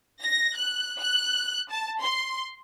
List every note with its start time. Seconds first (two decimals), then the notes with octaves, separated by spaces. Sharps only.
0.22 A#6
0.56 F#6
0.99 F#6
1.71 A5
2.00 C6